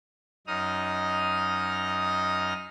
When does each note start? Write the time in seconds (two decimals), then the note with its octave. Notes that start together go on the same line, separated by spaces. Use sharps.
0.47 F#2 D#4 D#5 D#6 F6